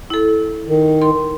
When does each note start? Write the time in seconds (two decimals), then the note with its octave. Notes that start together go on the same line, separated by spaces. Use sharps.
0.10 E4 A4
0.67 D#3
1.02 C6